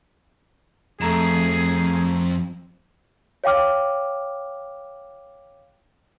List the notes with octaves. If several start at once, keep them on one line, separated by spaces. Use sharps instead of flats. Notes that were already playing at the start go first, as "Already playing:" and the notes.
F2 A3 G#4 A#5 E7
C#5 F5 G5 D6 F6